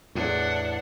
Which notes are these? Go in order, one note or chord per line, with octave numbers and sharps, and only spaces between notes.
E2 A2 D4 F#5